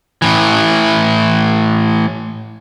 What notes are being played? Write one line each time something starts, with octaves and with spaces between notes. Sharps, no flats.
A2 E3